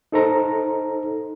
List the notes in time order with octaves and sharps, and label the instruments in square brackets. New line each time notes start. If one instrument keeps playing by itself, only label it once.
[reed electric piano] D#4 A4 C5 A#5